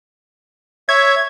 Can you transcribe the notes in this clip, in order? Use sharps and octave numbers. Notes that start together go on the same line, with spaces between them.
C#5 E5 G#6